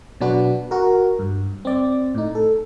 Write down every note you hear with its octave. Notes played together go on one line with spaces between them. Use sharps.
B2 F#3 D4 F#4 B4
F#4 A#4
G2
C4 D5
A2 D#4
A4